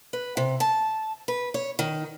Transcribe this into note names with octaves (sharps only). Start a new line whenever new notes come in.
B4
C3
A5
B4
C#5
D#3